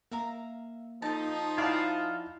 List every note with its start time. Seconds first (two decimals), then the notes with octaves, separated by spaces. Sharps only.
0.12 A#3 E5 F5 A#5
1.02 F3 D#4 A4 A5
1.58 E4 F4 D5 F5 F#5 G#5 A5